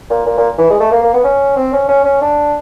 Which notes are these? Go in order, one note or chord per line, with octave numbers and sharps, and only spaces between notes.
A#2
A#2
A#2
E3
G#3
A3
A#3
A#3
B3
C#4
C4
C#4
C#4
C#4
D4